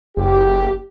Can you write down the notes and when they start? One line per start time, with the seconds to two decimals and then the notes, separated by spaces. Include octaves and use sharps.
0.17 F#1 G4